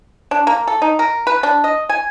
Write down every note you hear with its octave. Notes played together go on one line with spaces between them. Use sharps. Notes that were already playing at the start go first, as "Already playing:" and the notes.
D4
A#3
A4
D#4
A#4
B4
D4
D#5
G#5